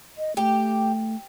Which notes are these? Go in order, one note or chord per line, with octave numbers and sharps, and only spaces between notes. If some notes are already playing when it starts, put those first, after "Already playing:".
D#5
A3 G4